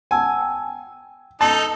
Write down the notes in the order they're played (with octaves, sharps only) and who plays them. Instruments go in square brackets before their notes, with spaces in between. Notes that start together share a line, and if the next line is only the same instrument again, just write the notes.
[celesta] F#5 A5 E6 [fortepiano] G#5
[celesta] G5
[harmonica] D#4 A4 [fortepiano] A5